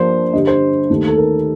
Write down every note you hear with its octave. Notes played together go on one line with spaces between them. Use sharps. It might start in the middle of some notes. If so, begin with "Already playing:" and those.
Already playing: G2 F3 A#3 D4 C5
G2 D3 G3 D#5
C5
D#2 D#3 A3
A4
A#4